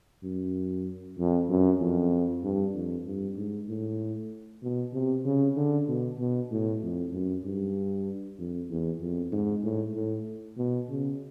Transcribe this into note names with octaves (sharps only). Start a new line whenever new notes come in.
F#2
F2
F#2
F2
G2
F2
G2
G#2
A2
B2
C3
C#3
D3
B2
B2
A2
F2
F#2
G2
F2
E2
F2
G#2
A2
A2
B2
C#3